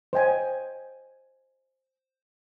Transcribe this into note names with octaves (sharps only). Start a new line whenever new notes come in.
C5 D#5 G5 G#5